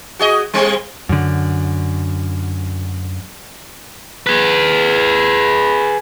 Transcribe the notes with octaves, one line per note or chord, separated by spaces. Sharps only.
F#4 G#4 D#5
G3 G#3 C4
F#2 D3
G#4 B4